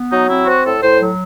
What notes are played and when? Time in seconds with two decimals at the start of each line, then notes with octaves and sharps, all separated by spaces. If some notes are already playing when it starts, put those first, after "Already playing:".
Already playing: B3
0.10 F#3 D#4
0.29 C4 E4
0.46 C4 F#4
0.64 A2 A4
0.82 A2 C5
1.01 F#3